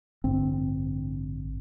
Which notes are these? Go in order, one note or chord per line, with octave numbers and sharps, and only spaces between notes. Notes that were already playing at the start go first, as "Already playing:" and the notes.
A1 G2 D3 C4